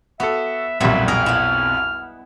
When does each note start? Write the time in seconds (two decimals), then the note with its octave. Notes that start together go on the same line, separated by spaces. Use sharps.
0.20 B3 F#4 A4 E5
0.80 B1 F2 A#2 F#3 G3 E5
1.08 G#4 A#4 D#5 F6
1.26 B3 E4